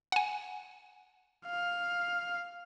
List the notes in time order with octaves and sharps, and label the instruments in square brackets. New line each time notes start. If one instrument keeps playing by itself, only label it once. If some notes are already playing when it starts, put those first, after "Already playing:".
[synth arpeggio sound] F#5 G#5
[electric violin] F5